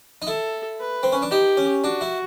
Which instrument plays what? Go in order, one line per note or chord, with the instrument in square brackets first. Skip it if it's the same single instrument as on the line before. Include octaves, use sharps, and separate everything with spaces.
[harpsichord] D#4
[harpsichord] E4 [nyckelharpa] A4
[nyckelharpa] B4
[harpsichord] C4
C#4
D4
[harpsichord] D#4 [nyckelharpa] G4
[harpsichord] C#4
[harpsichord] D4 [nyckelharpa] F#4
[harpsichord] E4